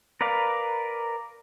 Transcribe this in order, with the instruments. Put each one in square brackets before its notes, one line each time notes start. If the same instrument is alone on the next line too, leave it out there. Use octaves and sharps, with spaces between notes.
[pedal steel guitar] A#4 B4 D5 F5